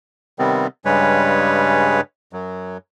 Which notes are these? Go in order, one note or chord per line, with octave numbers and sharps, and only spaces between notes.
C3 D#3 G3 B3 C4
G2 C#3 G3 G#3 B4 C#5
F#2 F#3